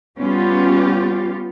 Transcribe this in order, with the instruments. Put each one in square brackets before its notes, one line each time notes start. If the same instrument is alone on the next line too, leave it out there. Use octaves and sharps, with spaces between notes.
[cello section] G3 B3 C#4 F4 G4